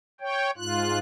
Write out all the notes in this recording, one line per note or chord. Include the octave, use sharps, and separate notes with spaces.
C#5 G5
G#2 F4 F#6